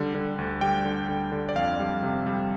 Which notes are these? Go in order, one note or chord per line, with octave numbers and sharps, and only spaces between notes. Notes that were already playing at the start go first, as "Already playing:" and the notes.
Already playing: D3 G3
D3
D2
G3 G5
D3
D3
D3
D5
F2 F5
G3
C3
G3